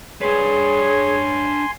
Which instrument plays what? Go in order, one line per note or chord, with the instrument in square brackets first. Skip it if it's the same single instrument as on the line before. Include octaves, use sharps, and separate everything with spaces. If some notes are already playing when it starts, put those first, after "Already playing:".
[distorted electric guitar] D4 B4 [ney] G#4 [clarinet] C#5 [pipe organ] G#5 C6